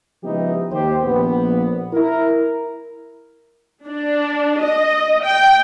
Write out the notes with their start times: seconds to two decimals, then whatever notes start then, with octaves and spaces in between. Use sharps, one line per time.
0.23 C#2 F3 B3 D#4 E4 G4
0.71 D#2 G4 C5
1.04 A#1 B3
1.93 E4 A#4
3.87 D4
4.63 D#5
5.23 G5